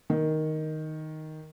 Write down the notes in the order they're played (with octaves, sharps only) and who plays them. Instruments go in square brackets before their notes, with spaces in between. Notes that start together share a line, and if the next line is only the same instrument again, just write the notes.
[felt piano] D#3